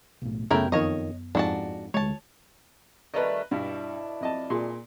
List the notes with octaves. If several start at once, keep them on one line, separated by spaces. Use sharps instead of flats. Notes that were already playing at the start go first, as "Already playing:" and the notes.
B1 A2
F#2 C#3 A3 B3 E4 A#4 G5
F2 D#3 C#5 D#5
F2 G#2 D4 F#4 A5
D2 F3 G#3 C#5 A5
D#3 G3 A3 B4 D#5
G2 B2 D4 E4
F2 D#5 A5
A#2 G#4 C6